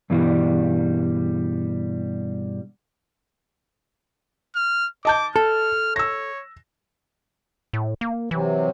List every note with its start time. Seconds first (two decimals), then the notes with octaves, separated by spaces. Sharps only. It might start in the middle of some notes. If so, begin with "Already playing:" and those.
0.10 G2 B2 E3 G3
4.56 F6
5.05 D#5 A5 D6 G6
5.36 A4 F6
5.96 C#5 E6 A#6
7.73 A2
8.01 A#3
8.31 C3 E3 F#3